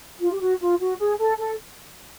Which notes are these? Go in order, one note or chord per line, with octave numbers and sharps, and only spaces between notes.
F4
G4
F#4
F4
F#4
G#4
A4
A4